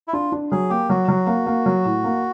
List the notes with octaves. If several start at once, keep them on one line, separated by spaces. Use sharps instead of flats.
E4
D4 F4
D4
F#3 G#4
A#3 G4
F#3 F#4
F#3
A#3
A#3
F#3
A2
A#3